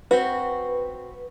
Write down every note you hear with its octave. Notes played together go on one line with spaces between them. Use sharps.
C4 F#4 B4